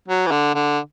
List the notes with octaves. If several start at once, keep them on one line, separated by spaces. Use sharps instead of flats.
F#3
E3
D3
D3